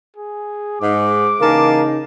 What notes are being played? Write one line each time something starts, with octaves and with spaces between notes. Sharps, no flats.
G#4
G#2 D6
C#3 E3 A#3 D#4 A#4 F5 G#5 A5